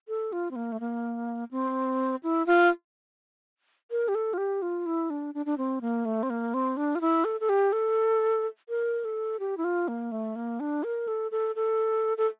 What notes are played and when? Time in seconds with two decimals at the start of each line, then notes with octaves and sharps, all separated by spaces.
0.08 A4
0.32 F4
0.51 C4
0.56 A#3
0.72 A3
0.80 A#3
1.51 C4
2.23 E4
2.46 F4
3.91 A#4
4.08 G4
4.15 A4
4.33 F4
4.38 G4
4.62 F4
4.86 E4
5.10 D4
5.34 D4
5.46 D4
5.58 C4
5.81 A#3
6.05 A3
6.23 C4
6.30 A#3
6.54 C4
6.77 D4
6.95 F4
7.01 E4
7.24 A4
7.40 A4
7.49 G4
7.72 A4
8.69 A#4
9.04 A4
9.40 G4
9.57 E4
9.64 F4
9.88 A#3
10.11 A3
10.36 A#3
10.60 D4
10.83 A#4
11.07 A4
11.31 A4
11.55 A4
12.17 A4